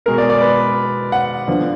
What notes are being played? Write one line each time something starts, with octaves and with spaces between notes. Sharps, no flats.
B2 G#3 B3 A#4
D5
D5
B4
F#5
D3 F3 B3